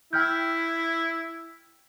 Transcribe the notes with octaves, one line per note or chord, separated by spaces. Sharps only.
E4 G5 F6 G6